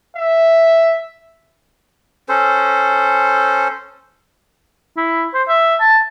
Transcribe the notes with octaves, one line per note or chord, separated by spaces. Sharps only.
E5
C#4 A4 C5
E4
C5
E5
A5